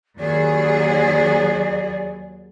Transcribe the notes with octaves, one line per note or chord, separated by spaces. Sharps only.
D#2 F#3 G#4 D5